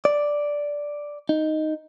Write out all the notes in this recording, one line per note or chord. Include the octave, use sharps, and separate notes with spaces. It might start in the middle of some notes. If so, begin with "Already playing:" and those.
D5
D#4